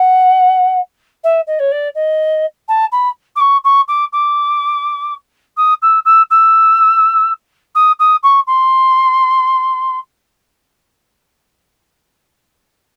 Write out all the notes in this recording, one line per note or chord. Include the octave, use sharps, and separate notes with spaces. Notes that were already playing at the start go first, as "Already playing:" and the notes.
Already playing: F#5
E5
D#5
C#5
D5
D#5
A5
B5
D6
C#6
C#6
D6
D6
D#6
E6
E6
E6
D#6
D#6
C#6
C6